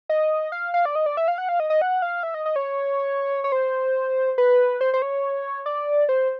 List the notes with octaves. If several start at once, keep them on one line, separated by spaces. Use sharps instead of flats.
D#5
F5
F5
D5
D#5
D5
E5
F5
F#5
F5
D#5
D#5
F#5
F5
E5
D#5
D#5
C#5
C#5
C5
B4
C5
C5
C#5
D5
C5